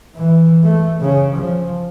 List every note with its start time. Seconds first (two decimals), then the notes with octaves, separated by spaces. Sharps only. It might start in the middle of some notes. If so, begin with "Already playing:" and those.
0.16 E3
0.64 A3
1.00 C#3 C#4
1.35 F3